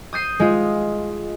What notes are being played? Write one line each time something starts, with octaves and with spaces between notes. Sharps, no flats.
D#6 G6 C7 D#7
G#3 F4